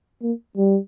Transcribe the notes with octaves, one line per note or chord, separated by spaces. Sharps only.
A#3
G3